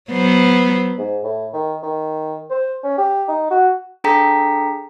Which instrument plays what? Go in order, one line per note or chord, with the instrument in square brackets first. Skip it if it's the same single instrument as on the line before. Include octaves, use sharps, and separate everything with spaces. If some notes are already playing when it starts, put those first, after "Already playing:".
[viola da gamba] F#3 B3 C5
[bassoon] G#2
A2
D#3
D#3
C5
C#4
G4
D#4
F#4
[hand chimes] D4 G#4 A4 G5 A#5 B6